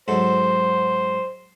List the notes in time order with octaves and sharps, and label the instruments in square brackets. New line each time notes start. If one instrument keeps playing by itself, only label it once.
[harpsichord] G#2 F#3 A4 [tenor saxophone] C5